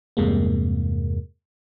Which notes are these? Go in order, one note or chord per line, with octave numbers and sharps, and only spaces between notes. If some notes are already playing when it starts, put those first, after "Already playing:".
E2 G2 C3 G#3 A#3